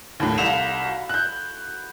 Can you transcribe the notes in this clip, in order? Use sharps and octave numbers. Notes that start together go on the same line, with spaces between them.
D#2 A2 E4 A4 F#5
C2 D#4 E4 F5 E7 F7
F#4
F#6 G6